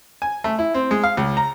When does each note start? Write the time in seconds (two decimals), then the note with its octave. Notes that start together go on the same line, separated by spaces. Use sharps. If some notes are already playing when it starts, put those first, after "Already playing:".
0.22 G#5
0.44 A3
0.59 E4
0.74 C4
0.91 G#3
1.04 F5
1.17 C#2
1.37 A#5